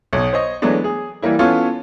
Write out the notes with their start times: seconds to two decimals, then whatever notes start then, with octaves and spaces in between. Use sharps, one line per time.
0.13 B1 B2
0.33 C5 C#5 D#5
0.62 E3 F#3 G#3 A3 B3 D4
0.84 G#4
1.22 E3 G3 A#3 E4
1.39 E3 B3 C#4 F4 A4